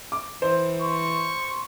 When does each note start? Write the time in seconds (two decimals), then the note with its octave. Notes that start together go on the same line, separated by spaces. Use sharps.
0.12 D6
0.42 E3 C5
0.82 C6 C#6